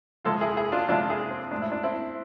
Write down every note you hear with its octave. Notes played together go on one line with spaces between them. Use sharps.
F2 C3 G#3 F4 A4
E4 G#4
E4 G#4
D4 F4
F2 C3 G#3 D4 F4
E4 G#4
C4
A2 G#3 D4
E4
D4
C4 E4